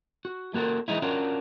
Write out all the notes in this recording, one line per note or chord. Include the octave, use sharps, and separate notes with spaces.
F#4
A3 A#3 F#4 A4 A#4
E3 G#3 D#4 E4
C#4 D4 F4 F#4 A#4